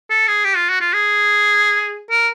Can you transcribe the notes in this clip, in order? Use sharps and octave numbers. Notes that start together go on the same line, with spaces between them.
A4
G#4
G4
F4
F#4
F4
G#4
A#4